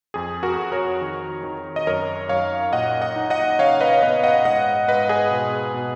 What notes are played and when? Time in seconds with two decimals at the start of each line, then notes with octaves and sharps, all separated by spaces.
0.14 F2 G#4
0.43 F#4 A#4
0.57 F2
0.72 A#4 C#5
1.01 D#3
1.43 D#3
1.76 D#5
1.87 F#2 A#4 C#5
2.29 F#2 C#5 F5
2.72 A#2 D#5 F#5
3.01 D#5 F#5
3.16 D#4
3.30 D#5 F#5
3.59 C#3 C#5 F5
3.81 B4 D#5
3.93 C#5
4.03 B3 B4 D#5
4.23 D#5 F#5
4.45 G#2 D#5 F#5
4.88 G#2 B4 D#5
5.09 G#4 B4
5.31 B2
5.74 B2